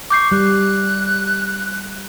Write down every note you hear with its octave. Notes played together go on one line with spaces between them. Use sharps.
C#6 D6 G6 C7
G3 F#6